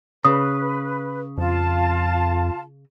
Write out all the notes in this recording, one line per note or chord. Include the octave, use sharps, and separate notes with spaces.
C#3 B4 D#6
F2 F4 A5